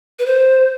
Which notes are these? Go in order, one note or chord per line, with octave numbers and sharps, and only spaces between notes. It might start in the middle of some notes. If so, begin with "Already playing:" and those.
B4
C5